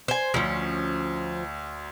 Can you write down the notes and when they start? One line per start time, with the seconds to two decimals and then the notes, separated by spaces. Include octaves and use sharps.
0.08 C5 G#5
0.34 D2 F3 C#4